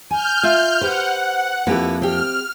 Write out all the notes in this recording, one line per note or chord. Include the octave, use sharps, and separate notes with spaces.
G#5 F6 G6
F4 E5
G4 B4 C5 F#5
F2 A#3 E4 G4 B4
C4 G4 F6